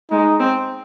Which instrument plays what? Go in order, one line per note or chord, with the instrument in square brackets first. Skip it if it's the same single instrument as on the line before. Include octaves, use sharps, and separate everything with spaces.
[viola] G#3 [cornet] D#4
[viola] C4